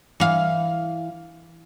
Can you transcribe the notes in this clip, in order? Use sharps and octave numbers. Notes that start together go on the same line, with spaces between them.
E3 F5